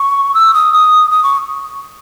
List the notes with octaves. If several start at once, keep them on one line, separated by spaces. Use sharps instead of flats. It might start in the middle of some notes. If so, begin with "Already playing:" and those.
Already playing: C#6
E6
D#6
D#6
D#6
C#6